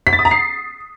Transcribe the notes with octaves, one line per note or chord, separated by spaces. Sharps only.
B6
A6
D#6
A#5
C7